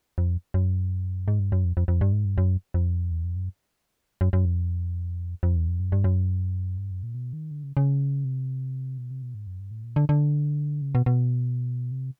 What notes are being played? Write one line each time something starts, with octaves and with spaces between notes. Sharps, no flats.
F2
F#2
G#2
G2
F#2
F2
F2
F2
G2
G#2
G2
F#2
F2
E2
F2
F#2
F#2
F#2
F2
F2
E2
F2
F#2
G2
F#2
G2
F#2
A#2
B2
D#3
D3
C#3
C#3
C3
B2
C3
B2
G#2
F#2
G2
A2
A#2
D3
D3
C#3
B2
B2
C3